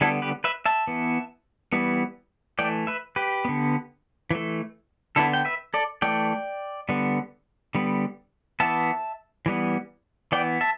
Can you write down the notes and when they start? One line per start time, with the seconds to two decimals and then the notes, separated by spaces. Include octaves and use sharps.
0.01 D3 G3 B3 E4 A4
0.22 G4 B4
0.44 B4 E5
0.66 E5 A5
0.87 E3 B3
1.73 E3 G3 B3
2.59 E3 A3 D5 G5
2.87 B4 E5
3.16 G4 B4
3.45 D3 B3
4.31 E3 A3
5.16 D3 B3 E4 A4
5.33 G5
5.45 B4 E5
5.74 A4 D5
6.02 E3 A3 D5 G5
6.89 D3 G3 B3
7.75 D3 G3 B3
8.60 E3 B3 E5 A5
9.46 E3 G3 B3
10.32 E3 B3 D5 G5
10.61 E5 A5